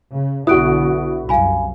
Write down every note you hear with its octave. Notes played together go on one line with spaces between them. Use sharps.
C#3
B1 D3 B3 E4 F#4 D#6 F#6 D7
C2 F#2 F5 G#5 B5